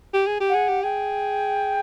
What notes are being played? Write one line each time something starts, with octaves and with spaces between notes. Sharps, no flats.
G4
G#4
G4
F#5
G#4
G4
G#4 G5